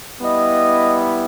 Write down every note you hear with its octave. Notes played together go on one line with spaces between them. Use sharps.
G3 B3 E4 D#5